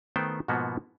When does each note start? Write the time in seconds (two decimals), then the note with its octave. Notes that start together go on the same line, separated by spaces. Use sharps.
0.16 D#3 A3 B3 C5 G5
0.48 G#2 B2 F3 A#3 B3 F#4